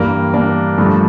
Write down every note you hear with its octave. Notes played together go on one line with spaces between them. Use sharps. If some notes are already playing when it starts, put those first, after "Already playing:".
Already playing: G2 E3 G3 A#3
A#3 D4
G2 E3 F3 A3